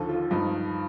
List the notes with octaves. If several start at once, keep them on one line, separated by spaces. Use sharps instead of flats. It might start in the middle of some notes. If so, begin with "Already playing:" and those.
Already playing: D#2 D3 F3 A4
F4
G2 F3 D#4